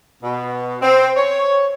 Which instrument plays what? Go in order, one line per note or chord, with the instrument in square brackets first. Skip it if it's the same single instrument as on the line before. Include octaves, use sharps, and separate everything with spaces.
[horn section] B2
C4
C#5